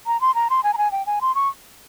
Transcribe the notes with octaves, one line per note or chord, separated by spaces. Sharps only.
A#5
C6
A#5
C6
G#5
A#5
G#5
G5
G#5
C6
C#6